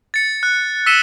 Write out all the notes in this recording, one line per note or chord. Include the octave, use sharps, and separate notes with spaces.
A6 C#7
F#6
E6 B6 C#7 D#7 E7 G7